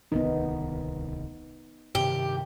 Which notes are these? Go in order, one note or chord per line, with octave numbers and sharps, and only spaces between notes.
D1 C2 D#3 B3 D#4
G2 C3 D#3 G4